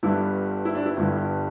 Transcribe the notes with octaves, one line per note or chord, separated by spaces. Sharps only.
G1 G2 D3 G3 E4
E4
D4
E4
G1 G2 D3 G3